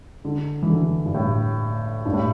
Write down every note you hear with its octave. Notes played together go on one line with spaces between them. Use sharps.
D3
E3
D3
G2
A2
G2
A2